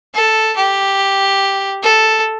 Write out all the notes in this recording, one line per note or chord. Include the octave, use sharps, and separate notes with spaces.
A4
G4
A4